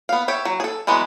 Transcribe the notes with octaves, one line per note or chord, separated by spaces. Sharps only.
B3 F5
G4 C#5 E5
F#3
G#4 A4
E3 F#3 G#3 B3